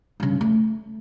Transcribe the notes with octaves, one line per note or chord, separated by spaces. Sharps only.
G2 C#3
A3